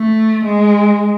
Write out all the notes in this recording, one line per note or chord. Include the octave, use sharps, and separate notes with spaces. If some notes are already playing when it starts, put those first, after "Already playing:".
Already playing: A3
G#3